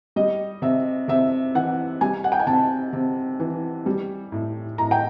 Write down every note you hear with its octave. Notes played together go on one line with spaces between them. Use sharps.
G3 D#5
C3 E5
C3 E5
E3 F#5
G3 G#5
F#5
G5
G#5
C3 A5
C3
E3
G3
A2
A2 A#5
G5